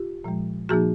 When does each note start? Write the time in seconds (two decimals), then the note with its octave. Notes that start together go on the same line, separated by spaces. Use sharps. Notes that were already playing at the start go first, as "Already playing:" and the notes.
Already playing: F4 G4
0.24 A#2 F3 G#3
0.69 A#2 F3 A#3 D#4 F#4 G#4